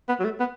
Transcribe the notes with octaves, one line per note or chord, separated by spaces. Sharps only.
B3
F#3
A3
B3